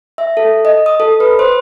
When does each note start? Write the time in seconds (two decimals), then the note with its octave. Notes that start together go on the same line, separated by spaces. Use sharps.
0.18 E5
0.37 A4
0.65 D#5
0.86 D#6
1.00 A4
1.20 B4
1.39 C5